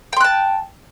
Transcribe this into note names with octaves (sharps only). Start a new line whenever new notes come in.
G5 A5 C6 F#6